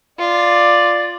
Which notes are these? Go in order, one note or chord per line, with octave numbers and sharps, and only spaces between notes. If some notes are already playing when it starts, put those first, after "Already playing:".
F4 D5